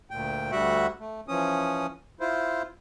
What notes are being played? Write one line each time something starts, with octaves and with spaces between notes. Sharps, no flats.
D2 A#2 G5
D2 D3 G3 F#4 E5 F#5
A3
E3 F3 C#4 D#6
E4 F4 C5